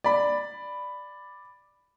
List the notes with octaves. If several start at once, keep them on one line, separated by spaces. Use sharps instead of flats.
D5 B5